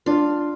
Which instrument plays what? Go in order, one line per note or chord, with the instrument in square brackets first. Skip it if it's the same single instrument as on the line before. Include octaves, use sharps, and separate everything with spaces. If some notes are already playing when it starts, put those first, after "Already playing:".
[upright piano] D4 [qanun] F4